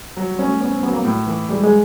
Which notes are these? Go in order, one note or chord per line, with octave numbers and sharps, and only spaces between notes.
F#3
G3
C#4
A3
B3 C#4
C4
F#3 B3
A#3
A2
E3
G3 G#3
G#3